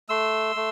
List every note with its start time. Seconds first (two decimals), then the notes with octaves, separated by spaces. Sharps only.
0.09 A3 C6 E6
0.56 A3